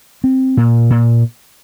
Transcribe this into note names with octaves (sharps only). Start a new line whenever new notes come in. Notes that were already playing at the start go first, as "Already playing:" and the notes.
C4
A#2
A#2